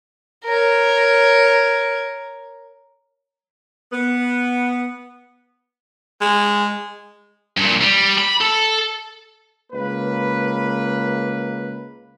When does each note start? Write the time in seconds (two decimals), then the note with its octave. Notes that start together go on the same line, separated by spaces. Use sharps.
0.45 A#4 C#5
3.91 B3
6.21 G#3
7.57 G2 A#2
7.81 G3
8.18 B5
8.40 A4
9.73 C#2 A#3 B4